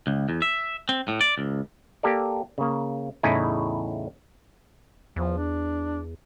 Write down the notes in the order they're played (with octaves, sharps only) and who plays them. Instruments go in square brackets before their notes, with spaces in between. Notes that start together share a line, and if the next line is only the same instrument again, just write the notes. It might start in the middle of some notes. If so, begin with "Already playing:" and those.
[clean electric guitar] C#2
E2
E5
C4
A2
D5
C#2
[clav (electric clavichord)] A#3 G4 A4 D5
C#3 A#3
E2 A2 C#3 D#4 E4 G#5
[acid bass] E2 [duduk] F3
[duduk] D4